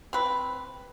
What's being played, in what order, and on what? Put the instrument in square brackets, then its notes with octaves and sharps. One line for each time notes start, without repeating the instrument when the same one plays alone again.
[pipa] C4 B4